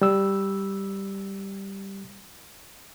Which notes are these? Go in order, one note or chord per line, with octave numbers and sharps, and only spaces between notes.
G3 E6